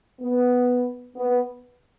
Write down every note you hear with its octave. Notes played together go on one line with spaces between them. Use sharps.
B3
B3